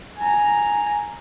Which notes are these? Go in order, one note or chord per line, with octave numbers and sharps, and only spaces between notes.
G#5 A#5